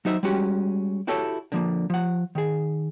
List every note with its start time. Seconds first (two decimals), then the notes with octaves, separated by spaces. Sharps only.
0.05 F#3 D#4 C5 E5
0.23 G3 G#3 C#4 F#4 G4
1.07 E4 F#4 G4 A4 C#5 E5
1.52 D3 F3 A#3
1.90 F3 F#5
2.35 D#3 G#4